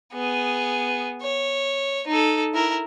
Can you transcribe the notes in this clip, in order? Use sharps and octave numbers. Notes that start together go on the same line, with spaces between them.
B3 G#4
C#5
D#4 A4
E4 A#4